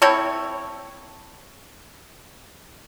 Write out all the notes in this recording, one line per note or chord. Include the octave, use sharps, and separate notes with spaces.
C4 E4 A4 C#5